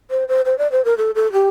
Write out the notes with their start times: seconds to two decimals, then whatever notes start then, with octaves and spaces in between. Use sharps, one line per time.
0.11 C5
0.28 C5
0.45 C5
0.58 D5
0.72 C5
0.85 A#4
0.98 A4
1.15 A4
1.33 G4